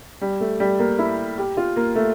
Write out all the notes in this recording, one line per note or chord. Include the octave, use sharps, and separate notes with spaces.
G3
A3
G3
A#3
E4
G4
F4
A#3
A3